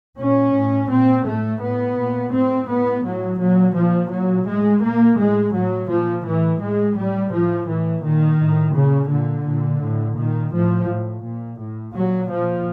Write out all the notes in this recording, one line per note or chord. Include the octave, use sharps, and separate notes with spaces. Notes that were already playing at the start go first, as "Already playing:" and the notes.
A#2 C#4
A2
A#2 C4
A2 A3
A2 B3
A#2
A2 C4
A2 B3
A2 F#3
A#2 F#3
A#2 F3
A#2 F#3
A2 G#3
A#2 A#3
A2 G#3
A2 F#3
A#2 F3
A2 E3
A2 G#3
A2 G3
A2 F3
A2 E3
A#2 D#3
A2
A#2 C#3
A#2 D3
A#2
A2
A#2 D#3
A2 F3
A2
A#2
A2
A#2 F#3
A#2 F3